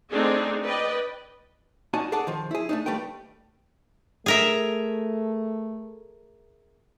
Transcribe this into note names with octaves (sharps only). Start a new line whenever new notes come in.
A3 C4 D4 D#4 G#4
B4 D5 D#5 G5
C#4 D#4 F#4 D5 G#5 A5
G#4 A4 D5 F#5 A5
D#3 F3
E4 G#4
A3 D4 D#4
D#2 G3 A3 B4 G5
A3 G#4 A#4 E5